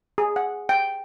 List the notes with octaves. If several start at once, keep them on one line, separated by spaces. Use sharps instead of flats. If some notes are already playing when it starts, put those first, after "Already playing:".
G#4
F#5
G5